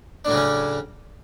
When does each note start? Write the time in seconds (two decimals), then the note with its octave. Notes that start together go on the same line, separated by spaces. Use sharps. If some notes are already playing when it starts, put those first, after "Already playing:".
0.25 D4
0.27 A2
0.30 F#3
0.33 C#3
0.36 C#4